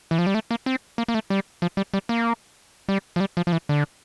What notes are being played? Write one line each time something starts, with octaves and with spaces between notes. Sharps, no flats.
E3
F3
G3
A3
A#3
C4
A#3
A#3
A3
G3
F3
G3
G3
A#3
G3
F3
G3
F3
F3
E3
D3